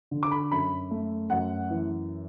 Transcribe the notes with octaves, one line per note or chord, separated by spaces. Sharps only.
D3
D6
B5
F#2 B5
A3
F#2 F#5
E3